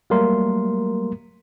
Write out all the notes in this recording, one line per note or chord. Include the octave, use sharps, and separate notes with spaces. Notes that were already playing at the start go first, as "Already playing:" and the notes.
F#3 G3 A3 A#3 A#4 C6